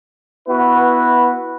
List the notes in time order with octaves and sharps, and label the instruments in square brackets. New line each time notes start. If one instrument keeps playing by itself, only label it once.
[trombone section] B3 E4 F#4 B4